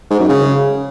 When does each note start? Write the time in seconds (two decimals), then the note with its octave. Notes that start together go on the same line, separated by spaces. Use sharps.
0.11 G#2
0.20 F#2
0.29 C#3